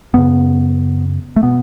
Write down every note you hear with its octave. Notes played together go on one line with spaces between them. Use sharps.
F#2 C#3 B3
A3
B2 B3